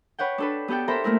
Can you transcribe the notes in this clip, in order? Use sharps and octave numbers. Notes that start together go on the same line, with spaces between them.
B4 C#5 F#5 G5
D4 A4 B4
B3 G4 A4 F#5 G5
A4 A#4 C5 E5 A#5 B5
A3 A#3 E4 A#4